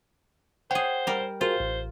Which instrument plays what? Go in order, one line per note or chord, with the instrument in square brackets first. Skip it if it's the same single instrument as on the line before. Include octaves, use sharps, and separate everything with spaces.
[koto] G#4 C#5 [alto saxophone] C5 [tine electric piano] F#5 G5
[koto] G3 A#4
[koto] F4 [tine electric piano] F#4 G#4 A#4 [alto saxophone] C5
[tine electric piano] A1